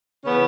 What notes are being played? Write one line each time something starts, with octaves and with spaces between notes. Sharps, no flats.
C#3 E3 B3 C#4